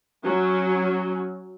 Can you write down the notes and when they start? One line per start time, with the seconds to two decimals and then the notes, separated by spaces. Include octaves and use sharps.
0.23 F#3 C#4